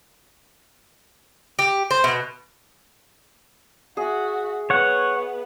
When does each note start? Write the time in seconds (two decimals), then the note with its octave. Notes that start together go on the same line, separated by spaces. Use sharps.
1.59 G4
1.90 C5
2.04 B2
3.97 F#4 G#4 E5
4.70 B3 C#5 F#5